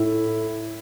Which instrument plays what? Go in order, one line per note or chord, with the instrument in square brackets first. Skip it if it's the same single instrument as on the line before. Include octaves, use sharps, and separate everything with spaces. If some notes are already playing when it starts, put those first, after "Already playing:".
Already playing: [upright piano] A2 E4